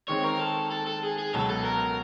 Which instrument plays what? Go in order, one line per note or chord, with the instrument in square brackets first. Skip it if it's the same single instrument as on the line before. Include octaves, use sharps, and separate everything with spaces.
[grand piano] D#3 G#3 C4 [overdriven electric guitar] C#5
[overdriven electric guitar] A#4
A4
A4
A4
G#4
G#4
[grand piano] C#2 B2 F#3 [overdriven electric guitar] A4
[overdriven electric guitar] A4
A#4